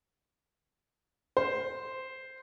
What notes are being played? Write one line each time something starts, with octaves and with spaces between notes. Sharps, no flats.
C5